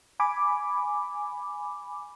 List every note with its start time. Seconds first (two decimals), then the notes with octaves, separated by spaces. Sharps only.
0.20 G#5 B5 D6